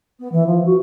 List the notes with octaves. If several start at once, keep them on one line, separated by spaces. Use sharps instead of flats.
B3
E3
F3
F#4